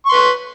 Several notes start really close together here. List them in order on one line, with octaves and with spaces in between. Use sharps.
C#6 C6 B4